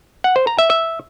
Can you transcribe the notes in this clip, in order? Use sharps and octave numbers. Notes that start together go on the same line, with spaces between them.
F#5
C5
A#5
E5
E5